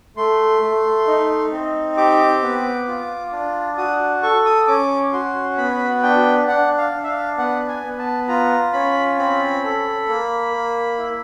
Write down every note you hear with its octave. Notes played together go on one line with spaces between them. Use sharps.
A3 C6
A3
D#4
C4
G4 D6
B3
F4
D4
F#4 D#6
A4 C#6
D#6
C#4 D6
F#4 C6
B3 B5
D4 G5
D4 F#5
F5
D4
E5
F5
B3 F#5
G#5
B3
A5
F4 A#5
C#4 B5
C4 B5
A4
A#3
A#3
E4